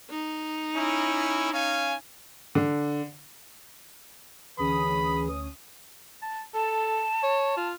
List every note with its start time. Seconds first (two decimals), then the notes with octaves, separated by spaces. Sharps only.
0.10 D#4
0.76 C#4 E4
1.53 C#4 F5 G#5
2.55 D3
4.59 D2 E3 C#4 G#4 B5 D#6
6.22 A5
6.54 A4 A5
7.23 C#5
7.57 F4